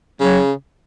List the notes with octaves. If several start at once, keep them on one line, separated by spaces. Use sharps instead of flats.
C#3 F#3